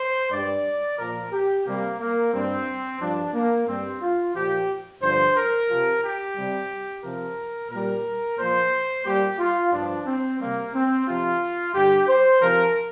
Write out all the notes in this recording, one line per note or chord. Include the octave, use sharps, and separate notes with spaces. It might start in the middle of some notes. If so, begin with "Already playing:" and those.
Already playing: C5
G2 G3 D5
A#2 F3 A#4
G4
C3 G3 A#3
A#3
G2 G3 C4
G2 F3 D4
A#3
G2 G3 C4
F4
A#2 F3 G4
G2 D3 F3 C5
A#4
C3 F3
G4
C3 G3
C3 F3 A#4
A#2 G3 A#4
A#2 F3 C5
A#2 G3 G4
F4
G2 F3 D4
C4
C3 G3 A#3
C4
C3 F3 F4
G2 D3 G3 G4
C5
C3 F3 A#4